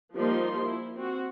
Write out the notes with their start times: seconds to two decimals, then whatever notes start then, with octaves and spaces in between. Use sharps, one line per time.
0.15 F3 G3 A#3 D#4 C6
0.66 E4
0.96 C4 F#4